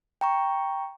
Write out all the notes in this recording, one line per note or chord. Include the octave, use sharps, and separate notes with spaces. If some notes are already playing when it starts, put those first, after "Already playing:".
G5 A#5 C#6